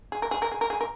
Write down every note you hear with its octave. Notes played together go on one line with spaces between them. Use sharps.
G#4
A#4
G#4
A#4
G#4
A#4
G#4
A#4